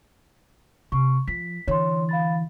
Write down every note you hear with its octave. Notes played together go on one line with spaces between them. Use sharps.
C3 C#6
F3 B6
D3 E3 C#5 C6
F5 B5 A6